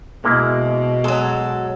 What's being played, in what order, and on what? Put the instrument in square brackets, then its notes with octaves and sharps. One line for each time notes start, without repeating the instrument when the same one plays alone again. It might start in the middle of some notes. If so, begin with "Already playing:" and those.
[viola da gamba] B2 [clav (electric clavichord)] G#3 A#3 E4
[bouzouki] F#3 A4 [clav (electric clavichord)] G#3